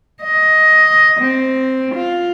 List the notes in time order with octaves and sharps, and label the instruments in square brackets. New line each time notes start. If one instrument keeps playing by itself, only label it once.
[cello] D#5
C4
F4